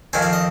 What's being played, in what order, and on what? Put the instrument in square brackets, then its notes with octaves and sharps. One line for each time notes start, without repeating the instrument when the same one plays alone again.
[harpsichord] F2 D#3 C4 G#5
F5
D#5